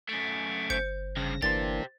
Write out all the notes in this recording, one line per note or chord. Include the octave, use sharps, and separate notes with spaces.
F#2 A3 C#6 D6 G#6
G1 C5 G6 C#7
G2 C#3 F3 A#6
G1 E3 A#3 D4 G4 C5 A6